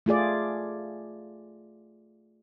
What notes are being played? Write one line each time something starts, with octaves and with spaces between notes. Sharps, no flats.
A3 F4 G#4 D5